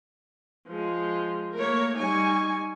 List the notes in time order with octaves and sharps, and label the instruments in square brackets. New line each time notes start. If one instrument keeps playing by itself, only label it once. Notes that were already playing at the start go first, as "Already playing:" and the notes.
[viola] F3 G#3
[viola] A3 A#3 [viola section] A#4 C#5
[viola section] G3 D#4 G#5 [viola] C#6